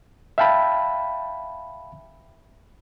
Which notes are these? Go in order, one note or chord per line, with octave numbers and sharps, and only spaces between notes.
E5 F5 G5 A5 B5